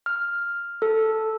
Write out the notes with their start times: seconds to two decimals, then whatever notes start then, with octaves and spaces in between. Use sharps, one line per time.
0.06 F6
0.82 A4